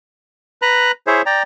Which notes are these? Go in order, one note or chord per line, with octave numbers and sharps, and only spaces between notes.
B4 A#5 F#6
E4 G#4 C5 C#5 E5
D5 G5 A#5